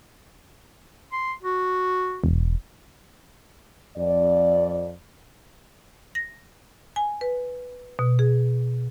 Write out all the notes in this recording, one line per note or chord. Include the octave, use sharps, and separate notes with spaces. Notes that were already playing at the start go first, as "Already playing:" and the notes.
C6
F#4
E1
F2 D5
A#6
G#5
B4
B2
G#4